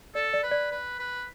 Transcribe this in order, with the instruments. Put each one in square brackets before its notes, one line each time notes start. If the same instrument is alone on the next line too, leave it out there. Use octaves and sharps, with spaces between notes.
[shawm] A4 [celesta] D5
[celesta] D5
[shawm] B4
[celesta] D5
[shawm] B4
B4